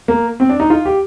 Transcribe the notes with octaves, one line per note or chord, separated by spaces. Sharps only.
A#3
C4
D4
D#4
F4
G4